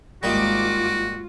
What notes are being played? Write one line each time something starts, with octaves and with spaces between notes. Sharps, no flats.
G#1 G#2 G3 A#3 D#4 F4 F#4 D6